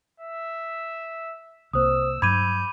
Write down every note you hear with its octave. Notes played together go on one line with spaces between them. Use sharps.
E5
C2 A#3 C5 D#6 E6
G2 F#3 B5 D6 G6 G#6 D#7